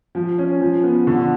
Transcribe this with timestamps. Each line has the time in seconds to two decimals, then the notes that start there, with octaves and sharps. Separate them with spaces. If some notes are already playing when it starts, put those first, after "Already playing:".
0.15 F3
0.38 C#4
0.61 F3
0.83 B3
1.07 D3